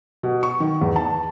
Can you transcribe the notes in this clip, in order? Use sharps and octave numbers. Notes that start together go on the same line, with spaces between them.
B2
C#6
D#3
E2
A5